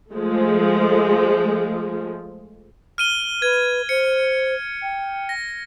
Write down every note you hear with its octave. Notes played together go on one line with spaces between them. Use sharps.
F3 G#3 A3
F6 D#7 G7
B4 G#6
C5 C#7
G5
A#6